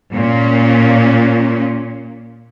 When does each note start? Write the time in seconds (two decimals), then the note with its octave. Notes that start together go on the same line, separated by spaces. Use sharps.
0.12 A#2 A#3 C#4